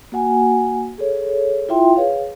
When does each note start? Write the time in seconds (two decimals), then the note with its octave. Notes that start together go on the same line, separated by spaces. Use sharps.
0.12 A#3 F#4 F#5 G#5
0.98 G#4 A4 C#5
1.69 E4 F4 E5 G5 C6
1.96 G#4 B4 C#5 F5